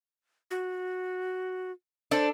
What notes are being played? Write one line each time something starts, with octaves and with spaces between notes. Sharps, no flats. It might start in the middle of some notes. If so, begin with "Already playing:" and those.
F#4
D4 A4 C5 D5